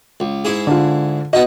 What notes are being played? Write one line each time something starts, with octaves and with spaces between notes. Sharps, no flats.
C#2
G#2 E4 G#4
D3 F4
B3 D#4 F#4 D#5